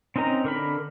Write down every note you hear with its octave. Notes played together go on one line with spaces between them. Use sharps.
C4 C#4 D#4 A#4 A#5
D3 A#4 B5